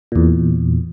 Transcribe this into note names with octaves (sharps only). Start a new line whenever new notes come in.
E2 A#2